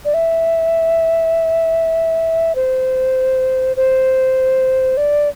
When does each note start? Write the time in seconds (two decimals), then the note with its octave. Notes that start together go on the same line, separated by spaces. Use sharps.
0.05 D5
0.14 E5
2.55 C5
3.77 C5
4.97 D5